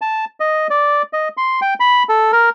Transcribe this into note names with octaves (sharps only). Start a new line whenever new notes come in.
A5
D#5
D5
D#5
C6
G5
B5
A4
A#4